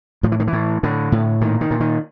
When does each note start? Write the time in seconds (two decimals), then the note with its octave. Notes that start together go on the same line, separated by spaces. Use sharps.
0.23 A2 F3
0.32 E3
0.40 D#3
0.47 E3
0.53 A2
0.83 A2 D3
1.12 A2
1.41 A#2 D#3
1.61 D#3
1.71 A#2
1.80 D#3